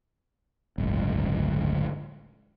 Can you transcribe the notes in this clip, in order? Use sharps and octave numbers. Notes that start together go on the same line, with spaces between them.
D1 G1 C#2